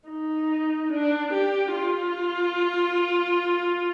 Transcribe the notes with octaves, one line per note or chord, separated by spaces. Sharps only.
D#4
D4
G4
F4